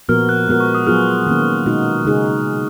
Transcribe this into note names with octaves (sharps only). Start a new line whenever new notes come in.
A#2 F3 B3 F#4 A#4 F6
F#6
G#3 B3 F#4 A#4
C#6
D#6
F#3 B3 F4 G#4 F6
D#3 A#3 C#4
B2 G#3 D#4 F#4
C#3 G#3 D#4 G#4